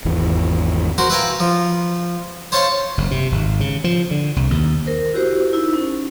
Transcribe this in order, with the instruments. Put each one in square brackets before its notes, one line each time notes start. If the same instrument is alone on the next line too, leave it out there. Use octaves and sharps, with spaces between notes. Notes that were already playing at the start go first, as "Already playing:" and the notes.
[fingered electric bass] G#1 E2 E3
[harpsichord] F#4 A#4 C5
B4 E5 F5 G5 G#5 A#5
F3
C5 C#5 F5 A5 C6 C#6
[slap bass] F#1
C3
G#1
C#3
F3
D3
C2
D#2
[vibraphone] A#4 C5
E4 F#4 G4 C5
D#4 E4
C#4